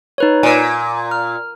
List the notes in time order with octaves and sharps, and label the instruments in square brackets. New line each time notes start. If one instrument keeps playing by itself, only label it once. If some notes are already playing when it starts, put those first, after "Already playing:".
[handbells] D#4 B4 C#5
[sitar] A#2 [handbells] G#5
[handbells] F6